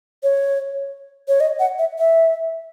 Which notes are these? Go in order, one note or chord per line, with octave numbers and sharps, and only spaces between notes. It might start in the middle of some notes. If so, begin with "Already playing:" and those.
C#5
C#5
D#5
F#5
E5
E5